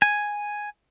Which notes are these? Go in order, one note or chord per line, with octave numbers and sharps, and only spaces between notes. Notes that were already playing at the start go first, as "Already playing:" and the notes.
G#5